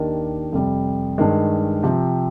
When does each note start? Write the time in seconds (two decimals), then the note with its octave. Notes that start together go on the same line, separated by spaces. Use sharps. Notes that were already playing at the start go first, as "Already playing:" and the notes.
Already playing: D#2 D#3 A#3 D4 G4
0.52 F2 C3 G3
1.18 G2 D#3 G#3
1.83 C3 F3 C4 G4